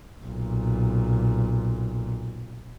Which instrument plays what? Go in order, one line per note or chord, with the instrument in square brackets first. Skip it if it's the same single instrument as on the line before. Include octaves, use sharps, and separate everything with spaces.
[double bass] B1 A#2